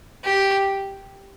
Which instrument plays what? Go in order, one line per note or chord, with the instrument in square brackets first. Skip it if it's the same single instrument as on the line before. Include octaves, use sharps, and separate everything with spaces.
[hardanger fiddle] G4